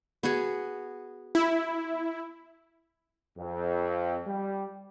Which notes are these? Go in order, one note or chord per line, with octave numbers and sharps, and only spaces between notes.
B3 F#4 G#4
E4
F2
G3